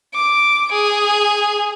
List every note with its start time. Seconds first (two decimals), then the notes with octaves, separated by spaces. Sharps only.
0.14 D6
0.72 G#4